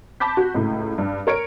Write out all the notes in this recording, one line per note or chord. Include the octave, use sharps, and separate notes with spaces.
A5 B5 D6 G6 B6
F#4
C#2 A2
G2
A#4 C#5 C#7 D7